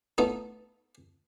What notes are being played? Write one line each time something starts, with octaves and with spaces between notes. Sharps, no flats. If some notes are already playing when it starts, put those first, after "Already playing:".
A3 B3 D#4